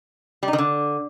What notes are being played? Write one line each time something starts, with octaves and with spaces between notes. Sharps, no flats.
G3
D#4
D#3
D3